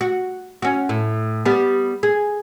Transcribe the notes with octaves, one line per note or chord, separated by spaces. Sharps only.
F#4
C#4 F#4
A2
G3 B3
G#4